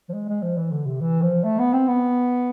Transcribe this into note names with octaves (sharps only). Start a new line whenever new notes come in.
F3
G#3
G#3
F3
E3
D3
C3
E3
F3
A3
B3
C4
B3